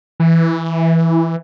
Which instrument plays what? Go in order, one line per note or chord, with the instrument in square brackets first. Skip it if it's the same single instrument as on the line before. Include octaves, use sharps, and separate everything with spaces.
[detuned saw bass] E3